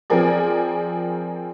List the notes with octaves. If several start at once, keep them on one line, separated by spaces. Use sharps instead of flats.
F3 C4 G#4 A#4 D5